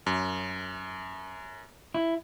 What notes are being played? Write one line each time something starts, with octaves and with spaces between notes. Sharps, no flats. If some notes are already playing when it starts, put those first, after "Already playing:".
F#2
E4